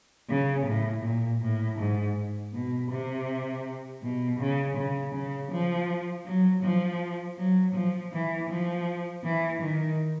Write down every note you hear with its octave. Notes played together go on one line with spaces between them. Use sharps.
C#3
A2
A#2
A2
G#2
B2
C3
B2
C#3
C#3
C#3
F3
F#3
F3
F#3
F3
E3
F3
E3
D#3